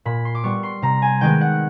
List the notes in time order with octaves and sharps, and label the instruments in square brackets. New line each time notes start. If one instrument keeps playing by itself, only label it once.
[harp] A#2 B5
C6
D6
G3 B3 C#6
C6
C3 A#5
G#5
D#3 G#3 B3 G5
F#5